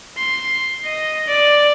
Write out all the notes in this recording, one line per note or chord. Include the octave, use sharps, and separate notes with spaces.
C6
D#5
D5